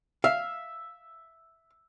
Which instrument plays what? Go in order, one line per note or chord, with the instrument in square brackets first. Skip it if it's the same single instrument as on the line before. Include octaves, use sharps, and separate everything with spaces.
[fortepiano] E5 [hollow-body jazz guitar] F5